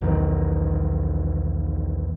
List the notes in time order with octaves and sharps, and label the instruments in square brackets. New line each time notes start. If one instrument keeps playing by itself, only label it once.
[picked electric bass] B1 E2 D#3